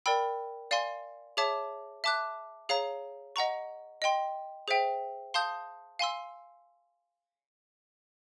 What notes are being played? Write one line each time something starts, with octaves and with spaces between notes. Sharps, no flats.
A#4 D5 G5 B5 E6
D5 F5 G#5 C6
G#4 C#5 E5 A5 D6
E5 A5 D6 F#6
G#4 C#5 F5 A#5
D#5 F#5 A#5 C#6
D#5 G5 C6
G#4 C5 E5 G5
F5 A5 C6 D#6 G6
F5 G#5 C6 E6